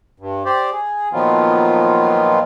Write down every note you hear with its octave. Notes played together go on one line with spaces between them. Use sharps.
G2
G4 C5 D5
G#4
A#2 D#3 F3 F#3 B3 F4